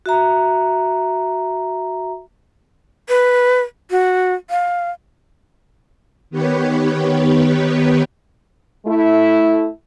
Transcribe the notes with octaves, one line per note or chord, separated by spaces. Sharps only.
F#4 E5 A#5
B4
F#4
F5
D#3 B3 G4 B4 C#5
A3 E4